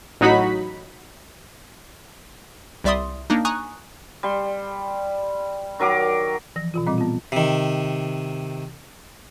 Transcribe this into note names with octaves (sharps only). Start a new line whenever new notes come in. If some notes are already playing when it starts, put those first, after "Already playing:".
A1 F#3 D#4 F#4 B5 B6
C2 G3 D5 E5 C6 D#6
A#3 D4 D#4
G#5 A#5 C#6 D#6 F#6
G3 C6
D#3 F#3 A#4 D6
E3 F3 A#6
B2 E3 F4
A#2 G3 C4 D#5 D6
B3 F4
C3 D#3